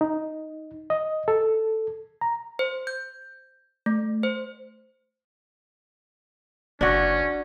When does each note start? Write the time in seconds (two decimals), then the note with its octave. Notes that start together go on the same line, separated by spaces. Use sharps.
0.01 D#4
0.90 D#5
1.28 A4
2.21 A#5
2.59 C5
2.87 G6
3.86 A3
4.23 C5
6.81 F#1 C#4 D4 F#4